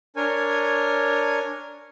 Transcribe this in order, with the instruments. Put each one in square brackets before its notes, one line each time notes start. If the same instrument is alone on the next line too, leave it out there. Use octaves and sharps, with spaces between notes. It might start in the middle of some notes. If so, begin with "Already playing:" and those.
[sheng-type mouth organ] D4 A#4 C#5 G#5